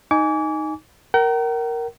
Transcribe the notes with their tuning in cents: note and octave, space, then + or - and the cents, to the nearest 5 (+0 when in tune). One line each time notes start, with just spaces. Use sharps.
D#4 +0 G#5 +0 D6 -35
A#4 +0 G5 -45